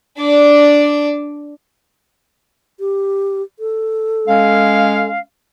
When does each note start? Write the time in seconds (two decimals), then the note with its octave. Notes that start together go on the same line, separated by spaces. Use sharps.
0.18 D4 D5
2.80 G4
3.59 A4
4.27 G#3 C#4 F5